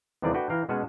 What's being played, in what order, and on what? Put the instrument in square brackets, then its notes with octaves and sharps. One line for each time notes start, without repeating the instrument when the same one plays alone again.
[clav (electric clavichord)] D#2 C3 E3 G3 G#4 D5
A3 D4 F#4 B4 G5
E3 F5 G5 A#5
B2 G#3 C#4 F#5 G#5 A5